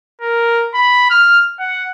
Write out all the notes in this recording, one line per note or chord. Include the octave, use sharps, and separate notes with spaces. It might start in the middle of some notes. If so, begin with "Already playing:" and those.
A#4
B5
F6
F#5